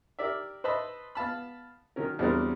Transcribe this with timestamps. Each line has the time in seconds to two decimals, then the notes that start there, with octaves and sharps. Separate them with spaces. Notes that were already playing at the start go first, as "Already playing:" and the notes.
0.19 G4 A#4 D5 E5
0.64 B4 C5 D#5 E5 A5 B5
1.15 B3 F5 A5 B5
1.96 D#3 F#3 C#4 A#4
2.19 E2 F#3 G3 C4 D4 A#4